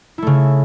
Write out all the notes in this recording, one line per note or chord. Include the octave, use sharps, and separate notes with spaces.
C#3 A3 E4